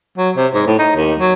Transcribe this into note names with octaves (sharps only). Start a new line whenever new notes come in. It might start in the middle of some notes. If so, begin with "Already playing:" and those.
F#3
C3
G#2
A2
D#4
D#2
F#3